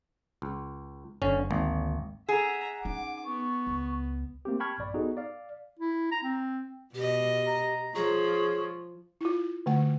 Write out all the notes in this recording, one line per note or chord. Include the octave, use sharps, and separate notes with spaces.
C#2
F#1 D3 C#4
G#1 D2 A#3
G#4 E5 F#5 A#5
C#4 D#4 D6
B3 C#6
C#2
A3 A#3 C4 G4
G5 A5 B5 C#6 F6 G#6
A#1 G2 D5 B5
B3 D#4 F#4 G#4 A4
D5 F5
E4
A#5
C4
B2 G4 D#5
A#5
F3 G#4 C#5
E4 F4
D3 A3 F#5